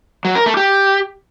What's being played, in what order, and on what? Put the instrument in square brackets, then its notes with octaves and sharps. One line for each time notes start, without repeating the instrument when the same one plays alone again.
[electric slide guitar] F#3
A#4
A3
G4